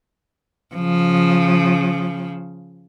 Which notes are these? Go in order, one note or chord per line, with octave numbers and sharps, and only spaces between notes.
C#3 F3